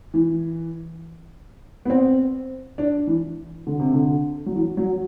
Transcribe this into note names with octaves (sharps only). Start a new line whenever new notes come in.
E3
B3
C4
D4
E3
D3
C3
D3
F#3
E3
F#3